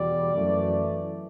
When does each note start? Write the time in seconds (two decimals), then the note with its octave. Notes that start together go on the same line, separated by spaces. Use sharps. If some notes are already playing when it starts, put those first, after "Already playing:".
Already playing: E2 B2 G3 D5
0.35 F#2 E3 A3